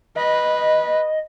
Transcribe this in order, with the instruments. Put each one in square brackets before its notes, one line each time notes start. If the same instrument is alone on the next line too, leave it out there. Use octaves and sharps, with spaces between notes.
[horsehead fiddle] B4 [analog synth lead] D#5